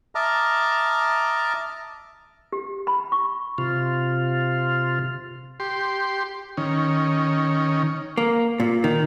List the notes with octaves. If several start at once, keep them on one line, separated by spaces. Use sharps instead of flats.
D#5 E5 A5 A#5 D6 F6
G4
B5
C#6
C3 F4
G4 C6
D#3 C#4
A#3
A#2
D#3